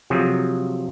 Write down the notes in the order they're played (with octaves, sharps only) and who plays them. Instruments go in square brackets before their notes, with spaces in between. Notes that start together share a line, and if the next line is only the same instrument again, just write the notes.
[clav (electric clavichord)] C3 F3 F#3 G#4